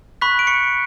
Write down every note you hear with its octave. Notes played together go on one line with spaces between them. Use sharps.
B5 C#6 F#6 B6
D7
C#6 C#7